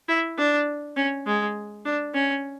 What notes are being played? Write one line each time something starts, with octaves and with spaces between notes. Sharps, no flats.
E4
D4
C#4
G#3
D4
C#4